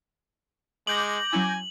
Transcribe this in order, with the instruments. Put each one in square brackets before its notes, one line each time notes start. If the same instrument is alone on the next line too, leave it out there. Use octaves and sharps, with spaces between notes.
[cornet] G#3 [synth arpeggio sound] D6 G6 A#6 [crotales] F#7
[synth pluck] F#3 C#4 E4 [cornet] G#5